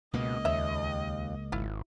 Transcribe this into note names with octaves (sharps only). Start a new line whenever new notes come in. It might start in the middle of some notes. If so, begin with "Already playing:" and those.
C#2 B2 A#3 D#5
D#2 C#5 E5
G#1 E4 F4